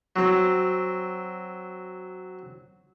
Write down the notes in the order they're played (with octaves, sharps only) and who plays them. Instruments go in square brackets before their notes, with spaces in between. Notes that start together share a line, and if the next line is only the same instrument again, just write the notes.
[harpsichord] F#3 C4